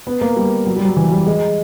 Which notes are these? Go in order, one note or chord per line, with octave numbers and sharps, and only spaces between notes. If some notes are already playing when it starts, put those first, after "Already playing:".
B3
A#3
G3
F#3
G3
F#3
E3
G3
G#3